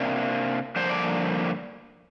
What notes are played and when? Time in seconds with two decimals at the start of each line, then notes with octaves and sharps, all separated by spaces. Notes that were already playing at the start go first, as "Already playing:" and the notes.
Already playing: C3 A#3 D4
0.76 G2 D3 F3 A#3 D4 C5
0.89 D5